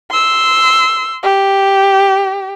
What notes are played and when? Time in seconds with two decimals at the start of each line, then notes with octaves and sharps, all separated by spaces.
0.11 C6 E6
1.23 G4